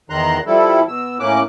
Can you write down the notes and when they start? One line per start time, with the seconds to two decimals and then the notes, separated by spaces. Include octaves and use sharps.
0.10 E2 D#3 A#5 C6 F#6
0.47 F3 G3 E4 A4
0.88 B2 E6
1.20 A2 A#3 C#4 D6 F#6